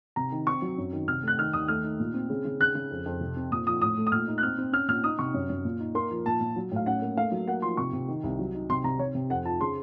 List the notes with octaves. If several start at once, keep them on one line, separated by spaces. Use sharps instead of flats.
C3 A#5
D#3
C4 C#6
F#3
F#2
D#3
C3 F6
A3 F#6
D#3 F6
D#2 D#6
A3 F6
D#4
A#2
C4
C#3
C#3
C#3 F#6
C#3
F2
F2
C3
C4
A#2 D#6
F3 D#6
A2 D#6
A3
D#6
A#2 F6
D#4
F#6
C4 F6
C4
C#4 F6
A#2 F6
D#4 D#6
C3 C#6
F#2
F#2
A#2
D#4
A#3 C6
F3
A#2 A5
A#2
F#3
A2 F5
C#4 F#5
A#3
A3 F5
F#3
A#3 F#5
F3 C6
C3 C#6
C3
D#3
C2
F#3
D#4
C3 C6
C3 A#5
C3 C#5
C3
F2 F#5
F3 A5
C#3 C6